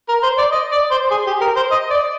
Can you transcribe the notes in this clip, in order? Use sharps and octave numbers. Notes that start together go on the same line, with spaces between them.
A#4
C5
D5
D#5
D5
C5
G#4
G4
A#4
C5
D#5
D5